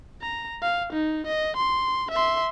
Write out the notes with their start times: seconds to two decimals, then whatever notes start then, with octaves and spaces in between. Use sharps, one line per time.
0.21 A#5
0.62 F5
0.93 D#4
1.27 D#5
1.57 C6
2.11 E5 C6